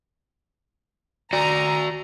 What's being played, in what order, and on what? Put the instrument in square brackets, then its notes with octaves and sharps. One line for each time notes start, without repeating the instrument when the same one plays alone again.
[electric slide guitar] F#4 D5 [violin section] A#5